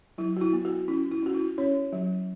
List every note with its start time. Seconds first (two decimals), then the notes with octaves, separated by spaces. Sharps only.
0.18 F#3 E4
0.37 F#4
0.41 E4
0.53 B3
0.65 F#4
0.88 C#4 E4
1.11 E4
1.23 C#4 F#4
1.34 E4
1.58 C#4 C#5
1.93 F#3